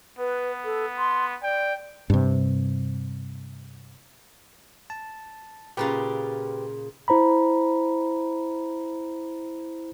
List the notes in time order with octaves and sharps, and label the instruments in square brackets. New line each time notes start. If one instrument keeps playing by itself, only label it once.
[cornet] B3 [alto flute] B4
[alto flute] A4
C6
[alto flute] D5 [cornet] G5
[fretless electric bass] G2 C3
[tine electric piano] A5
[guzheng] A#2 C#3 F4 [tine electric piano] G4 B4
[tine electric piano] E4 C5 A#5 B5